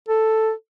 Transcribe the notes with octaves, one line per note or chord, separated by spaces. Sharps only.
A4